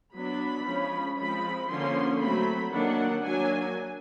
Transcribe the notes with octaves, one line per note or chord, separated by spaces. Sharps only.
F#3 B3 D4 B5
F3 G#3 C#4
F3 G#3 C4 B5
D3 F3 A#3 C#4 C6
F#3 A3 C4 B5
D#3 F#3 A#3 D4 F#5
F#3 A#3 D4 G#5